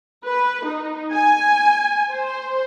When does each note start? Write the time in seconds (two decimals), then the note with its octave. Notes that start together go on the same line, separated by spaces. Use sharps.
0.24 B4
0.65 D#4
1.12 G#5
2.11 C5